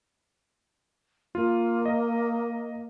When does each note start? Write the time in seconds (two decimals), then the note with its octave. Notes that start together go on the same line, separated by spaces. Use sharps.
1.35 A#3 F4
1.85 D#5